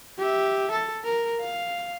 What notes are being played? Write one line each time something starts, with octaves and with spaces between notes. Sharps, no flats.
G4 E5
A4
A#4
F5